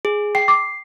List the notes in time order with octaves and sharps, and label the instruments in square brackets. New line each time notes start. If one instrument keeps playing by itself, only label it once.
[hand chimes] G#4
[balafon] G5 [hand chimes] C7
[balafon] D6